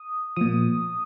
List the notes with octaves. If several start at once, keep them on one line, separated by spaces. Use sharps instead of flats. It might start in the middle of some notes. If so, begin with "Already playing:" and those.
Already playing: D#6
A#2 F3 D#6